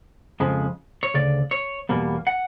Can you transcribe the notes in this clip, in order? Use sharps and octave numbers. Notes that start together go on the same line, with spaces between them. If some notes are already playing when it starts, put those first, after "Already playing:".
F2 C#3 F3 G#3
C#5
D2 C#3 D5
C#5
E2 B2 G3 A#3
F#5